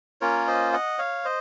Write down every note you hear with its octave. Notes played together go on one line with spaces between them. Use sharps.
A#3 C#4 F4 A#4 C#5
C5 D#5
D#5 F#5
C#5 F5
C5 D#5